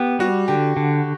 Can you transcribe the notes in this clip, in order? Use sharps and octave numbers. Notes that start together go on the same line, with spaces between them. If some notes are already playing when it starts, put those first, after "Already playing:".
Already playing: B3 G4
G3 F#4
D3 G4
D3